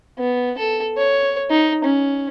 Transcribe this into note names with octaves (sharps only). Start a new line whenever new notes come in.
B3
A4
C#5
D#4
C#4